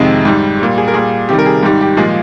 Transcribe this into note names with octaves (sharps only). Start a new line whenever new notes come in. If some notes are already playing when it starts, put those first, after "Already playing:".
Already playing: F2 C3 D#3 G#3
G#2 G3
A#2 G3
G#4
A#4
A#2 G3 G#4
C3 D#3 G3 G4
A#4
G#4
G#2 D#3 G3 G4
G4
A#2 F3 G#3 G#4